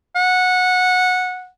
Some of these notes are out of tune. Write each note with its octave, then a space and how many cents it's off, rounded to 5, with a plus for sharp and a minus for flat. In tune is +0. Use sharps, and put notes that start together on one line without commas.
F#5 -15